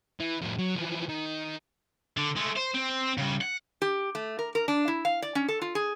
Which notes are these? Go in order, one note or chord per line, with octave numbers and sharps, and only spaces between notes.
E3
F2 A2
F#3
E3 F3
D#3
D3
G#3 A3
C5
C4
C#3 G3
F#5
G4
A3
A#4
A#4
D4
E4
F5
D5
C#4
A4
F4
G#4